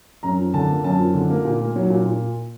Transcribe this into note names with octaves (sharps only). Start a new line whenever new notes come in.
F#2 A#5
F3
D3 A5
A#3
F#2 A5
F3
D3
A#3
A#2
A#3
F#3
A#2
A#2